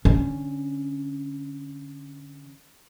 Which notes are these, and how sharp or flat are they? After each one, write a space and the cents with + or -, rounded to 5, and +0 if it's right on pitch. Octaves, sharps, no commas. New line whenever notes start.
D3 -10 C#4 +0